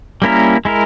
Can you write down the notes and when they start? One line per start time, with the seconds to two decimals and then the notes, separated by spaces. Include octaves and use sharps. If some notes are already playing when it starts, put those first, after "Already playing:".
0.22 G3 A#3 C#4 E4 A#4
0.65 G#3 E4 A#4